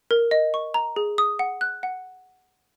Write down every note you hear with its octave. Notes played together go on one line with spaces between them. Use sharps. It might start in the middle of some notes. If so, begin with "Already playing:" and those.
A#4
D#5
C#6
A#5
G#4
D#6
F#5
F#6
F#5